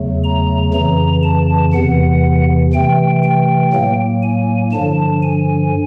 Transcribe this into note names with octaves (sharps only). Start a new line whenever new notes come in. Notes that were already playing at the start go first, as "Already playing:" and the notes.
Already playing: E2 C#3 F#3 A3
A#5
F2 C#3 E3 A#5
A5
E2 C3 E3 F#5
C3 E3 A3 G5
G5
A2 F#3 A#3
G#5
G2 D3 F3 A5
G#5